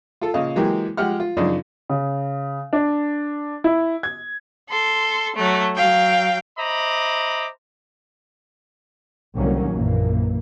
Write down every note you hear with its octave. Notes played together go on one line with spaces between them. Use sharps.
F4 A4
A#2 C#3 D#5 F5
E3 F#3 G#3 A#3 G4
F3 G#3 G4 F#5 F6
F4
F#2 C#3 F3 D4 D#4
C#3
D4
E4
G#6
A4 C6
F#3 A3
F#3 F5 G5
C5 D#5 E5 A#5 B5 D6
C2 D3 D#3 F#3 A#3 C#4
A#1 F#2 A#2 E3 A#3